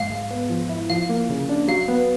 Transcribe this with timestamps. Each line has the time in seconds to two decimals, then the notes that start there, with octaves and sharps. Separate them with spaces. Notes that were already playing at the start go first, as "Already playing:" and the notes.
Already playing: G#2 F5
0.10 G#3
0.30 B3
0.50 F3
0.69 E4
0.90 F3 F5
1.09 A#3
1.29 C#3
1.49 D4
1.68 F#3 F5
1.88 B3